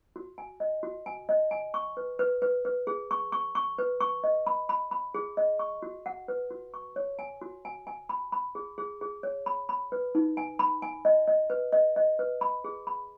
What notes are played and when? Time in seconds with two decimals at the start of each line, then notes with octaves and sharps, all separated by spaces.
0.16 F#4
0.38 G#5
0.60 D#5
0.83 F#4
1.06 G#5
1.29 D#5
1.51 G#5
1.74 C#6
1.97 B4
2.19 B4
2.42 B4
2.65 B4
2.87 G#4
3.11 C#6
3.32 C#6
3.55 C#6
3.78 B4
4.01 C#6
4.24 D#5
4.47 B5
4.69 B5
4.91 B5
5.14 G#4
5.37 D#5
5.59 C#6
5.82 F#4
6.06 F#5
6.28 B4
6.50 F#4
6.74 C#6
6.96 C#5
7.19 G#5
7.41 F#4
7.65 G#5
7.87 G#5
8.09 B5
8.32 B5
8.55 G#4
8.78 G#4
9.01 G#4
9.23 C#5
9.46 B5
9.69 B5
9.92 B4
10.15 D#4
10.37 G#5
10.59 B5
10.82 G#5
11.05 D#5
11.28 D#5
11.50 B4
11.72 D#5
11.96 D#5
12.19 B4
12.41 B5
12.64 G#4
12.87 B5